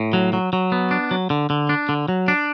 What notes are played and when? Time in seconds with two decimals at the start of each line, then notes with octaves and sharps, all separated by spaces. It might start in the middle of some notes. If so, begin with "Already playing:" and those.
Already playing: A2
0.13 F#3
0.33 F#3
0.53 F#3
0.72 B3
0.91 D4
1.11 F#3
1.30 D3
1.50 D3
1.69 D4
1.89 D3
2.08 F#3
2.28 D4